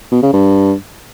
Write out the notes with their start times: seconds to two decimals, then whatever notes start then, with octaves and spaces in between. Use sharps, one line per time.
0.11 B2
0.22 C#3
0.33 G2